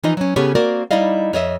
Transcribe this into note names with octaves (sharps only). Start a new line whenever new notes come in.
E3 F3 D#4 F4 D#5
F#3 C#4
C#3 B3 C#4 G4 A4 C#5
A#3 C4 F#4 A#4 D5
G3 D#4 E4 D5 D#5 F5
F2 C#5 D#5 E5